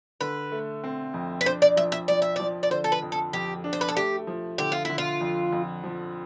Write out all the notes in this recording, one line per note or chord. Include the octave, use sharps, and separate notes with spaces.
D3 B4
A3
C4
F2
B4
D4 C5
D5
F3 E5
E5
F3 D5
E5
F3 D5
D5
D3 C5
A4
B4
F2
A4
F2 G4
D4
C5
B4
A4
A3 G4
F3
D3 G4
F4
D3 E4
F4
F2
F2
F3